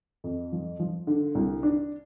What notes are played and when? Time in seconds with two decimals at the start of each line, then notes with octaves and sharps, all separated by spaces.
0.24 F2
0.52 F3
0.79 F3
1.07 D3
1.35 C2
1.63 D4